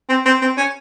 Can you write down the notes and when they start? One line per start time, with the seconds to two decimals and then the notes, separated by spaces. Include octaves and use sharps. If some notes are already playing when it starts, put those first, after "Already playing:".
0.09 C4
0.25 C4
0.42 C4
0.57 C#4